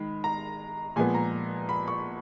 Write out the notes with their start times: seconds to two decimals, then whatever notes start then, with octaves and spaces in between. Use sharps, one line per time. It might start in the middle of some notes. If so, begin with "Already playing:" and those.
Already playing: D#3 G#3 B5
0.24 A#5
0.96 A#2 F3 G#3 B3 G#5
1.15 A#5
1.69 B5
1.88 C#6